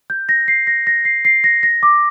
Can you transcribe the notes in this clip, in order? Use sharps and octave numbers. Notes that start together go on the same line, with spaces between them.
G6
A#6
C7
A#6
A#6
C7
C7
A#6
A#6
D6